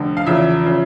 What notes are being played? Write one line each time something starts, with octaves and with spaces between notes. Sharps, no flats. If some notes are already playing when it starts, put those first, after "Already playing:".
Already playing: F1 D3
F5
E2 C#3 F3 E5
C#3 F3